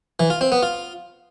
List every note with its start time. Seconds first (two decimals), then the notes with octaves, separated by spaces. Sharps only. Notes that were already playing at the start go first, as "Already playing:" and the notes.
0.20 E3
0.30 F4
0.41 C4
0.52 B3
0.63 F4